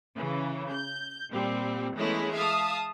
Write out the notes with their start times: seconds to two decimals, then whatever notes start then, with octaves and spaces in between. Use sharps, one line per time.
0.15 C#3 E3
0.72 G6
1.30 A#2 G3 C4
1.96 E3 G#3 A3 B3 C#4 E4
2.35 E5 F5 A5 D#6